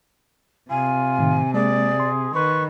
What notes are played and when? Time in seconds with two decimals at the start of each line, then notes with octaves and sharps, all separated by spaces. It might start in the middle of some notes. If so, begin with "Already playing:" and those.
0.70 C3 F4 G#5
1.19 A2 D#3
1.54 G#3 A#3 G#4 D5
2.00 C6
2.34 D#3 B4 C#6